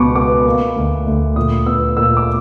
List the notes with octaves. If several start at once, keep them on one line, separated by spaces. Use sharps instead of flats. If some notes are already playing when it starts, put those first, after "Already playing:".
Already playing: C#2 B2 B3 C#6 D6
B3 D6
A#3
D2
D2
A#2 D#6
B3 E6
A#2 E6
D6